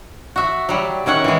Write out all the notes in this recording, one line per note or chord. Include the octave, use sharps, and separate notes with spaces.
F#4 E5
F#3 G3
D#3 C#4 E5 F#5
E3 G#3